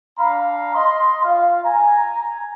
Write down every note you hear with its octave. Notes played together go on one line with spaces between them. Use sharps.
D4 F5 A#5 B5
D#5 C6
F4 F5
G#5 A#5